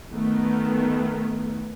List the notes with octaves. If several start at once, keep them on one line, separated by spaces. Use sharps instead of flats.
D#3 A3 B3